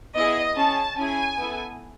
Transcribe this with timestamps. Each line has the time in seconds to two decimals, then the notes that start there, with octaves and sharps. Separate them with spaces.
0.15 B3 E4 G#4 D#5
0.56 C#4 G#4 A5
0.97 C#4 E4 G#4 G#5
1.39 B3 E4 A4